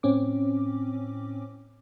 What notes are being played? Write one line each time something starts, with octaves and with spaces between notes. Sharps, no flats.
A2 C4 C#4 D6